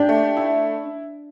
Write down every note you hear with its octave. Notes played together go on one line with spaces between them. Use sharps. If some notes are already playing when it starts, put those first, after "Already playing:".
Already playing: D4 G4
A3
E4